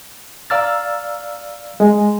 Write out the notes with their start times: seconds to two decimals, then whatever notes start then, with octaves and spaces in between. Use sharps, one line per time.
0.50 D5 F5 A#5 E6 F6 A6
1.80 G#3